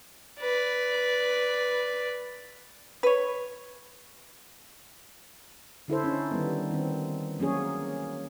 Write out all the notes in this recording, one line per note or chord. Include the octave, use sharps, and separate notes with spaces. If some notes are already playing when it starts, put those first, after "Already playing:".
B4 D5
B4 C#5
D3 E4 A4 C5
C#4 D#4
D#3 G3 B3
D#3 C4
F#3 A#3 C#4 G#4 C#5